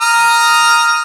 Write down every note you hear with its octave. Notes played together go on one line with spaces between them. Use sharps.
A#5 D#6 F6